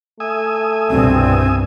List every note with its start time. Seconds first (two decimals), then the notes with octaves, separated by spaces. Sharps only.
0.20 A3 E5 G#5 D#6
0.90 C2 G2 B2 C4